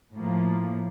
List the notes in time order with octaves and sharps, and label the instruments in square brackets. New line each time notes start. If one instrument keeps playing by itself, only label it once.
[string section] A2 F3 A#3